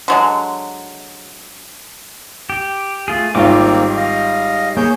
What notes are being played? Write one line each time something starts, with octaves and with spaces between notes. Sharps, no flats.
D3 F#3 G#3
G4
A3 F4 G#4
G#1 D#3 G3 A#3 C4 F4 D6
D#5 F5
A#3 G#4 C#5 G6